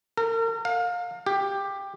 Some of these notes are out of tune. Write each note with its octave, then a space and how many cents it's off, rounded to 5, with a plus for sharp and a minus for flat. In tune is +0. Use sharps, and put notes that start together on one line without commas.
A#4 -40
F5 +25
G4 +10